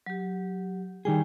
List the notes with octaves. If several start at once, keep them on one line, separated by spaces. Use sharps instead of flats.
F#3 G4
D#3 G3 G#4 G5